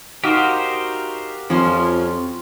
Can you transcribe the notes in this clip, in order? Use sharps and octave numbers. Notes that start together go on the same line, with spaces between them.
D#4 F#4 G4 A#4 C5 F5
F2 F3 C#4 C6 C#6